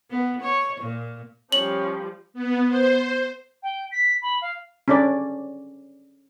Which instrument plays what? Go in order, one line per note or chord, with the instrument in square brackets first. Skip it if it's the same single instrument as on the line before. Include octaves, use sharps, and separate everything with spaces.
[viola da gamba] B3
C#5
A#2
[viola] F3 G3 [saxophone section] C#4 C#5 [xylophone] F#7
[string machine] B3
C5
[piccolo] G5
B6
B5
F5
[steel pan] C#4 D4 D5